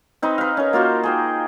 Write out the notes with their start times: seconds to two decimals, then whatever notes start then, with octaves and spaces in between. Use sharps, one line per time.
0.22 C4 D#4 B4
0.38 B4 F5
0.57 C#4 A#4
0.73 A#3 F4 F#4 C5
1.03 G#4 C5 G5